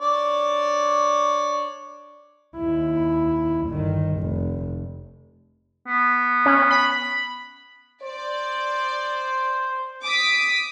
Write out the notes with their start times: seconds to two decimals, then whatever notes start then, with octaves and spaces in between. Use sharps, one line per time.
0.01 D4 C#5 D5
2.57 D#2 E4
3.69 G1 D#3
4.19 F1
5.87 B3
6.46 C#4
6.70 B5
8.03 C5 D5
10.03 D6 D#6 B6